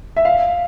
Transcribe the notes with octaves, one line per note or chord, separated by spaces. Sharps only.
E5
F5